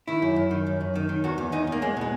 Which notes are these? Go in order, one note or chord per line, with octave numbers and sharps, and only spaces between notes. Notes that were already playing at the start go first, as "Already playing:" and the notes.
D#3 E4
F#2
F#2
D#3
F#2
F#2
D#3
D#3
E2 F#4
E2
E2 D#4
E2 A#3
E2 G#3
B2 G#3